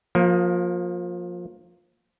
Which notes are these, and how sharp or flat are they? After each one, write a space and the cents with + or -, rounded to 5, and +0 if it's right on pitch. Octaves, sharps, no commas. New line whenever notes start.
F3 +25 A#3 +0